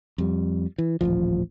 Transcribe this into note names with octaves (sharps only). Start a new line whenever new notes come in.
F2 G3
E3
D#1 A1 E2 F3